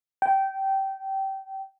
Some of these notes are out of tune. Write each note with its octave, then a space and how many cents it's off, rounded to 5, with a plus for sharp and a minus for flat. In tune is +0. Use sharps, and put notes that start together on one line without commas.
G5 -20